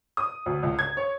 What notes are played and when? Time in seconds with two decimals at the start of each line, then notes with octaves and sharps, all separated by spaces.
0.17 D#6
0.46 D2
0.63 C#2
0.79 G#6
0.97 C#5